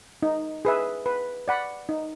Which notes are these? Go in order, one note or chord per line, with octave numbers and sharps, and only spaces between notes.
D#4
G#4 B4 E5
B4
D5 F#5 B5
D#4